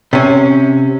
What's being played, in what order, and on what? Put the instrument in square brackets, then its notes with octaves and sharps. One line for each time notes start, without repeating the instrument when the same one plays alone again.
[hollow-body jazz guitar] C3 C#4